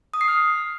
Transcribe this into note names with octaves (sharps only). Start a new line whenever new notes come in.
D#6
C7
F6